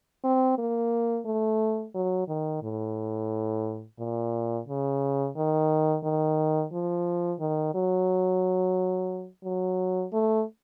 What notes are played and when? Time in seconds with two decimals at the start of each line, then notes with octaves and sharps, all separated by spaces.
0.24 C4
0.58 A#3
1.26 A3
1.95 F#3
2.28 D#3
2.63 A2
3.99 A#2
4.68 C#3
5.36 D#3
6.04 D#3
6.72 F3
7.39 D#3
7.75 F#3
9.44 F#3
10.13 A3